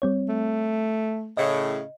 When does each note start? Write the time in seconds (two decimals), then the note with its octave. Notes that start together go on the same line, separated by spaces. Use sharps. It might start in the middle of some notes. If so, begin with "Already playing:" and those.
0.02 G3 C4 C#5
0.29 A3
1.37 A2 C#3 D#5